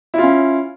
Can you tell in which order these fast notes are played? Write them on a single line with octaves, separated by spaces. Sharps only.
E4 F4 C#4